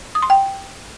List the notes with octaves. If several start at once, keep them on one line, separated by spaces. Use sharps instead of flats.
D#6
C6
G5